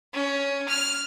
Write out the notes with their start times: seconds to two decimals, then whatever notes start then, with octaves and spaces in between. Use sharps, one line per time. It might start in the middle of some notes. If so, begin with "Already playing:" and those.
0.13 C#4
0.68 F6